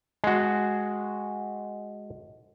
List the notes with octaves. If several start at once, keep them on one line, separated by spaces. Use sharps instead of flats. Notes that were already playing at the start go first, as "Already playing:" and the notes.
G#3 F#4